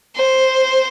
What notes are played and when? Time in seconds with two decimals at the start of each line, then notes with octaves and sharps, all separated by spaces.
0.16 C5